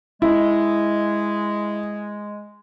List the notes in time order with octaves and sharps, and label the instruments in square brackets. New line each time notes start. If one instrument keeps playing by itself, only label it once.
[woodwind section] G#3 [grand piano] E4